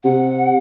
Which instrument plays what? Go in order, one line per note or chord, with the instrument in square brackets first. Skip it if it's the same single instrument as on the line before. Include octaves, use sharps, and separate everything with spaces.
[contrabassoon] C3 [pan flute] F#5